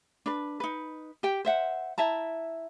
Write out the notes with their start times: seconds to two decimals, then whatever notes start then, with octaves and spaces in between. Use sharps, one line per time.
0.26 D4 B4
0.60 D#4 B4
1.23 G4 G5
1.45 C5 E5 F#5
1.98 E4 E5 A5 A#5